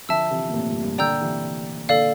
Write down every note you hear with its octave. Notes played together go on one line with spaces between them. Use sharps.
D3 F3 E5 A5 E6
C3 E3
A#2
A2 C3
G2 A#2
G2 A#2
A#2 D3 D5 G5 A#5 E6 G6
C3 E3
A#2 D3 A4 D5 F5